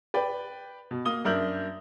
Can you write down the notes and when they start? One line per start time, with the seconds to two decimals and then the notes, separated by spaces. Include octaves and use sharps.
0.14 B4 D5 G5
0.91 B2
1.05 A#3 D#6 G7
1.25 F#2 D4 A#4 E5 G6 F#7